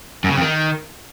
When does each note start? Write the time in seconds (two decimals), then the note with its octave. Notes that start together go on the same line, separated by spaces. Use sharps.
0.24 F#2
0.30 C#3
0.36 F2
0.41 D#3